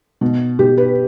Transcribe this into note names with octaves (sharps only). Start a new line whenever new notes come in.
B2
B2 G4
B4